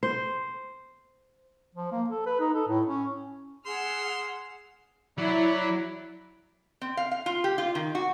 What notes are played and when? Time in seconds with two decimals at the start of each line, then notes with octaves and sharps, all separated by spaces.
0.03 C5
1.75 F3
1.92 A#3
2.09 A4
2.26 B4
2.40 D#4
2.54 A4
2.67 A2
2.87 C#4
3.66 G#4 F#5 C6 E6 F6
5.18 F#3 E4 D5 B5
6.81 C4
6.97 F5
7.11 F5
7.26 F4
7.44 G4
7.58 F4
7.75 D#3
7.95 F#4